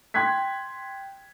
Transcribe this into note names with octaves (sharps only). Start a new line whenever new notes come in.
G5 C6 F#6 G#6 B6